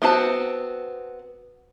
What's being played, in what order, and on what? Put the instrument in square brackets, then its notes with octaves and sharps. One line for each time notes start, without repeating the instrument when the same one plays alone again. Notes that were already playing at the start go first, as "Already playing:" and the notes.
[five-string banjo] B3 C4 F#4 A5